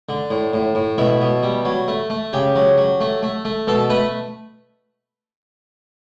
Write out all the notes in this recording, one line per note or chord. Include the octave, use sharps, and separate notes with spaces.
D3
A2
A2
A2
B2 E4
B2
G3
F#3
A3
A3
C#3 G4
F#3
F#3
A3
A3
A3
B2 A4
A3 B4